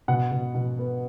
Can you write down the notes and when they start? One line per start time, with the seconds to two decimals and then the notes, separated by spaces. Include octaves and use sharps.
0.08 B2 F#5
0.31 B2
0.55 B2
0.79 B3